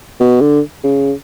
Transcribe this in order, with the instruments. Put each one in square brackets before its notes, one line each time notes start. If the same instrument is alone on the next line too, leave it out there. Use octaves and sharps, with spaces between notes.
[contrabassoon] B2
D3
C#3